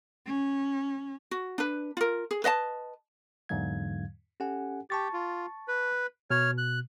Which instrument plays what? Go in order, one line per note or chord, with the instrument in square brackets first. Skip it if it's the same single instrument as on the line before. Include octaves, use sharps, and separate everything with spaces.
[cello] C#4
[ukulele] F#4
D4 B4
F4 A#4
G#4
B4 D#5 F5 A5
[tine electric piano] E2 G#2 D3 F#3 F5 G#6
C#4 G4 A4 F#5 G#5
[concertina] G4 [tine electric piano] A5 C#6 A6
[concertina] F4
B4
[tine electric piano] B2 [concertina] C#5 F6
[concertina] F#6